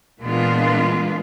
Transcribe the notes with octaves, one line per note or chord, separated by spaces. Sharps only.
A#2 E3 G#3 B3 D4 F4